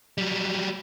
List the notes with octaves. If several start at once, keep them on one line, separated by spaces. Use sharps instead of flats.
F#3 G3